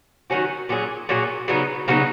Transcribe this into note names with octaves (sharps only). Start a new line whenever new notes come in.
D#3 F#3 C#4 F#4
A#2 F#3 C#4 G#4
A#2 F#3 C#4 G#4
C#3 F#3 B3 D#4
C#3 F#3 B3 D#4